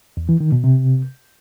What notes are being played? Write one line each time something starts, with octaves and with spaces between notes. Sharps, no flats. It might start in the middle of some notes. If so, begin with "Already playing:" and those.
E2
E3
D#3
B2
C3